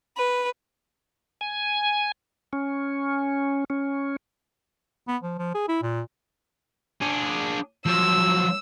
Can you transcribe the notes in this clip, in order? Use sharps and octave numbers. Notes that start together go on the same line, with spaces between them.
B4
G#5
C#4
C#4
B3
F3
F3
G#4
E4
A#2
D4 G#4
F3 F#3 E6